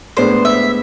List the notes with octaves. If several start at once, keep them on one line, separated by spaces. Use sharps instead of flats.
A2 G#3 B3 D4 C5
E5